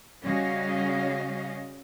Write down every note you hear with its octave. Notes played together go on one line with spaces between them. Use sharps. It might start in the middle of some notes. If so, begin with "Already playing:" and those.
C#3 G3 C#4 F#4 D#5 F5